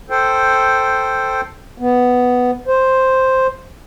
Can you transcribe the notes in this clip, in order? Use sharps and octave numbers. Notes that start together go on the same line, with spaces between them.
A4 C5 G5
B3
C5